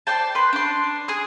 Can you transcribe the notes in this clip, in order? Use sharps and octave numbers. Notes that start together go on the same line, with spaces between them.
C5 D5 G5 A5
B4 C6
D4 C6
G#4 D#6